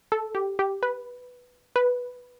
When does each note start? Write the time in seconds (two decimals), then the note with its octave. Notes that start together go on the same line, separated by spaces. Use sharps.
0.12 A4
0.35 G4
0.59 G4
0.83 B4
1.76 B4